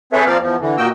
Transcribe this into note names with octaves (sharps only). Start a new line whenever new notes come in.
C4 G#4 A4 B4 C#5 E5
F3 A#3 C4 D5 F5
E2 F3
D3 E3
A#2 A#3 F#4 D#5 G5 E6